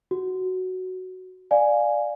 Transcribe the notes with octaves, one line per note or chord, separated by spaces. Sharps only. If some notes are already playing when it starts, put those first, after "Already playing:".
F#4
D5 F5 G#5